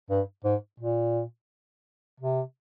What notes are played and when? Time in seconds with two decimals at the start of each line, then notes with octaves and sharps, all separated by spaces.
0.10 G2
0.45 G#2
0.80 A#2
2.20 C3